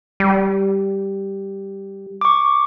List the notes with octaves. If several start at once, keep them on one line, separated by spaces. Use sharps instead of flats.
G3
C#6 D6